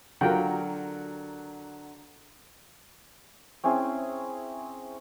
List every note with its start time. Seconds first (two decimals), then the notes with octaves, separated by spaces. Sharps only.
0.21 D3 F#3 F4 G4 A#4 F#5 G5 A#5
3.64 C4 C#4 E4 G#4